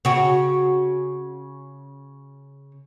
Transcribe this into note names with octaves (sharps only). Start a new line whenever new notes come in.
C#3 F#4